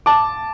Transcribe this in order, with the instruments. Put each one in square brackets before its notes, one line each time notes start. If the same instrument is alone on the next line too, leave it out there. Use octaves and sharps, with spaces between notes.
[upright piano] A5 D6